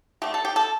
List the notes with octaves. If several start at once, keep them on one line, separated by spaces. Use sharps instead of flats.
D3 A3 G4
A4
G4
A4